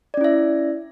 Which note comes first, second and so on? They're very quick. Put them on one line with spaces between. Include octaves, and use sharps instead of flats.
D5 C#4 E4 E5